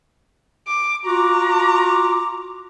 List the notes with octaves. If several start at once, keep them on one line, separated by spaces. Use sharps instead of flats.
D6
F4 F#4 A#5 D6